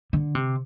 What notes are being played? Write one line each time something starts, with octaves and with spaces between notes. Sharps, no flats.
D3
C3